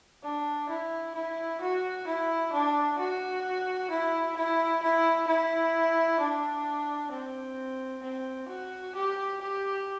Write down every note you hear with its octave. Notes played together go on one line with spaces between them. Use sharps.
D4
E4
E4
F#4
E4
D4
F#4
E4
E4
E4
E4
D4
C4
C4
F#4
G4
G4